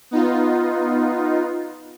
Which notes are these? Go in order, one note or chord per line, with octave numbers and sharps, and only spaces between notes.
B3 D#4 F4